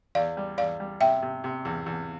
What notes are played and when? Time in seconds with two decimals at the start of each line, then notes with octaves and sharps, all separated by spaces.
0.15 E2 D5 F5
0.37 G3
0.58 E2 D5 F5
0.80 G3
1.01 C3 E5 G5
1.22 C3
1.44 C3
1.65 E2
1.86 E2